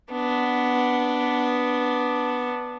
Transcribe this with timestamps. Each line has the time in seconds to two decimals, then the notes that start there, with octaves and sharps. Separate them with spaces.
0.12 B3 D4